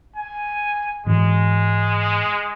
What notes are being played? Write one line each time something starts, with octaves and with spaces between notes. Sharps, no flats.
G#5
G#2 E3 G#3